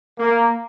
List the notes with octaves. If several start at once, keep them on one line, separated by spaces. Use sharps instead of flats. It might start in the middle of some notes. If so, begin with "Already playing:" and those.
A#3